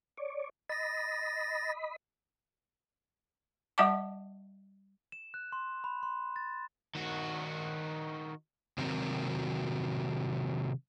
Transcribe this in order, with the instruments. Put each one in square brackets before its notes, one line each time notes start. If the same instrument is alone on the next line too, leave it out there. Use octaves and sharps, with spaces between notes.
[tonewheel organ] C#5 D5
[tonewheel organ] D#5 B5 [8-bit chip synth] A6 A#6
[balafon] G3 D#5 E5 F#5 A5 D6
[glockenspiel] E7
F#6
C6
B5
C6
A6
[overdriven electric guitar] D#3 F#4
[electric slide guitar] C3 D#3 F#3 C4 F#4 A#4